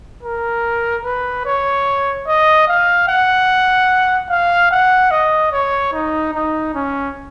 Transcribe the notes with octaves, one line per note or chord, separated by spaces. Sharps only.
A#4
B4
C#5
D#5
F5
F#5
F5
F#5
D#5
C#5
D#4
D#4
C#4